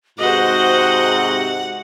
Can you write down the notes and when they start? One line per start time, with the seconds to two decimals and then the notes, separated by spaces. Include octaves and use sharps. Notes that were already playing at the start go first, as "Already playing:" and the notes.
0.19 G#2 C3 F#4 C5 D#5 F#5